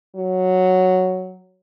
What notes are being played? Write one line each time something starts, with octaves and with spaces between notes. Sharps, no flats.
F#3